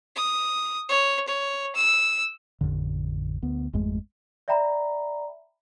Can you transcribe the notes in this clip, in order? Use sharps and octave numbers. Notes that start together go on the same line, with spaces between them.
D#6
C#5
C#5
E6
A1 F2 D3
D2 B3
G#1 F2 G#3 A3
D5 E5 G5 A#5 B5